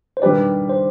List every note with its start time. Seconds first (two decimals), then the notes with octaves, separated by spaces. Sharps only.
0.17 C5
0.22 D#3 G3 D4 G4 B4 D5
0.70 C5